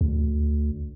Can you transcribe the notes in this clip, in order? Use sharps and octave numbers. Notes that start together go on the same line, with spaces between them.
D2